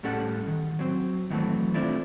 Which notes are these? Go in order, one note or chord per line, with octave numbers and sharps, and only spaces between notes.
A2 G3 C#4 A4 F#5
D#3
F#3 C4
D#3 E3 F#3 A3 C4
A3 C4 D4 E4 F4